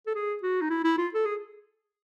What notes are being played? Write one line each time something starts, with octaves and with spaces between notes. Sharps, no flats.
A4
G#4
F#4
D#4
E4
E4
F4
A4
G#4